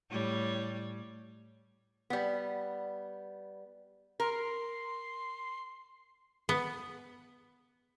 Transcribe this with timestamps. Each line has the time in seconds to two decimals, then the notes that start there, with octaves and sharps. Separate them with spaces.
0.10 A2 G3 C#5
2.10 G3 B3
4.20 A#4 C6
6.49 B3